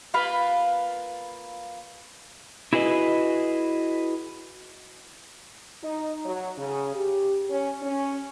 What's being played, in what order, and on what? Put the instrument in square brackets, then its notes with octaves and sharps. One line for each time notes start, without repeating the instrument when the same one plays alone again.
[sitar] A#3 F4 [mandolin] B4 F5 B5
[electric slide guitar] E4 F#4 G#4 B4 D#5
[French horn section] D#4
F#3
C#3
G4
C#4
C#4